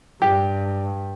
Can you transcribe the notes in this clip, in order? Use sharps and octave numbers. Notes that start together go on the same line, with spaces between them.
G2 G4